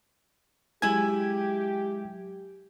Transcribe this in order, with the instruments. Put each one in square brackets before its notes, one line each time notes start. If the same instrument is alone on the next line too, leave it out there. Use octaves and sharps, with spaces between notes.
[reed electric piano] F#3 G#3 G#6 [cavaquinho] E4 G#5 [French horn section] G4